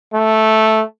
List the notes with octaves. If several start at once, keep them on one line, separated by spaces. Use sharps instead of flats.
A3